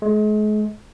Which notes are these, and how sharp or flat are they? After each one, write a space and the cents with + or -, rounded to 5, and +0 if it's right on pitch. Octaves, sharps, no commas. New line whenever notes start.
G#3 +40